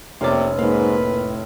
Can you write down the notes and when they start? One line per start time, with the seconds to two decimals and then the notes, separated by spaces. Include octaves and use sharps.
0.21 F1 C3 A#3 C#4 D5
0.59 G#2 A#3 B4
0.99 A2